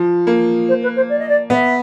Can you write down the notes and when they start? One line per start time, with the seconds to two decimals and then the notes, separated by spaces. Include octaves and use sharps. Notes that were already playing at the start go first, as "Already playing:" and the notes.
Already playing: F3
0.27 A#3
0.68 C5
0.83 B4
0.96 C5
1.09 D5
1.19 D#5
1.29 D5
1.50 B3 E5